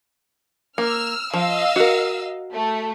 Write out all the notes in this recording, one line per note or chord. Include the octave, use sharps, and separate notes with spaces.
A#3 E6 F6
F3 D#5 F5 E6
F#4 A#4
A3